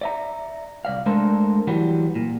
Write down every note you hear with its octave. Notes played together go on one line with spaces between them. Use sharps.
D5 E5 A#5
C2 D5 F5
G#3 A3 D4 A4 A#4 C5
E3 F#3 G3 B3
A#2